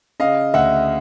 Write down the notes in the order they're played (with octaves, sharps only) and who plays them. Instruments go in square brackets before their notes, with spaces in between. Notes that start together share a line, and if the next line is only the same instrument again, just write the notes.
[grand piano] C#3 D#5 F5
D2 E5 F#5